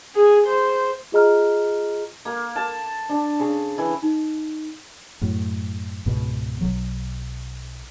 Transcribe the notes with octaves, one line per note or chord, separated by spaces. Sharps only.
G#4
C5
F4 G#4 D#5 A#5 F6
A#3
A5
D4
C#3
E3
D#4
F#2 A2
C#2 G#2 B2
B1 F#3